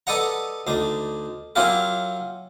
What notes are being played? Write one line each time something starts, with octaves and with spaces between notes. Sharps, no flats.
A4 B4 D5 D#5 F#5 A#5
D2 D4 D#4
F#3 C#4 E4 F4 G4 A#4